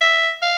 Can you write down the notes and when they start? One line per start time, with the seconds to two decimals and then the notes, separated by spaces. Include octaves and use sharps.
0.01 E5
0.42 F5